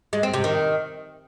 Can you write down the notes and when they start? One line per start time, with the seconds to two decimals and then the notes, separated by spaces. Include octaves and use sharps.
0.13 G#3
0.23 C4
0.34 C3
0.44 D#3